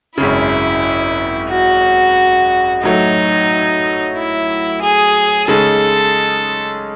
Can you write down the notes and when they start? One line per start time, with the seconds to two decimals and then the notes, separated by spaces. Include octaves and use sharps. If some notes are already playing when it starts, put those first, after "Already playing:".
0.18 G#1 F#2 C#3 E4
1.51 F#4
2.83 A2 F#3 A3 D#4
4.16 E4
4.82 G#4
5.48 C#3 G#3 D#4 A4